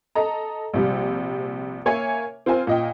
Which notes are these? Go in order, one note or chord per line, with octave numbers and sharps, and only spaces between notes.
A4 D#5 A#5
A#1 C3 G3
A#3 C#5 E5 G#5
C4 F4 A#4 C5 G#5
A#2 D#5 G5